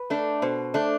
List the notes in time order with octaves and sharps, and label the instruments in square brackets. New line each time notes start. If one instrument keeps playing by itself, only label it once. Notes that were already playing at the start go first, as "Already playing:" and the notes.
Already playing: [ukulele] B4
[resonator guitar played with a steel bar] A3 D4
[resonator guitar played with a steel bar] B2 [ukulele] C5
[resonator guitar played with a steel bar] A3 D4